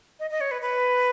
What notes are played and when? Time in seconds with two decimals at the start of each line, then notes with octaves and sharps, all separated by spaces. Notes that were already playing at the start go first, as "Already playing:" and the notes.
0.20 D#5
0.31 D#5
0.41 C#5
0.51 B4
0.62 B4